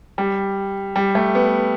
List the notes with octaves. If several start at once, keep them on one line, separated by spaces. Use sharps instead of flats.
G3
G3
A3
B3